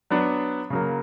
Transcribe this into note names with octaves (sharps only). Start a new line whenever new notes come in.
F#3 B3 D4
C#3 F#3 A#3